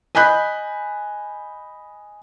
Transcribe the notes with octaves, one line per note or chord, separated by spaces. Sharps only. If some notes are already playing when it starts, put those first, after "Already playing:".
D#5 G#5 B5 F#6 G6 B6